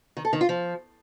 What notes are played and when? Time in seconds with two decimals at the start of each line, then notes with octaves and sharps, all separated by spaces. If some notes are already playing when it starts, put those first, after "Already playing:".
0.17 D#3
0.25 A4
0.33 D#3
0.41 F4
0.49 F3